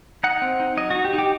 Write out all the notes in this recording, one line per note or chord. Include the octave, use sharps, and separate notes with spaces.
D#4 F#5
C4
D#4
F#3 D#5
D#4 F#4
G4
D#4
G4